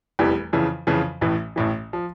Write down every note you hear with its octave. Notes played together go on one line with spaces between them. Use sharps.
F1 E2 E3 G3
F2 C#3 E3
F2 C#3 E3
A1 A2 E3
A1 A2 E3
F3